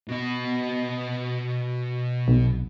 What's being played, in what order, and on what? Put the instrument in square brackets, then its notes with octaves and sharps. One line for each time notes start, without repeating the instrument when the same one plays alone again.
[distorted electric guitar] B2 D#5
[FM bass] B1